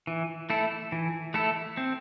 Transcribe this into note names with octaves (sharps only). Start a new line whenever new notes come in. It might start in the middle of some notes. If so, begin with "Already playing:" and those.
E3
A3 E4 A4
E3
A3 E4 A4
C4